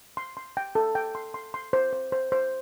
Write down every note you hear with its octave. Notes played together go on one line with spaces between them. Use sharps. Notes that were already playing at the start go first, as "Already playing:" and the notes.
C6
C6
G5
A4
G5
C6
C6
C6
C5
C5
C5
C5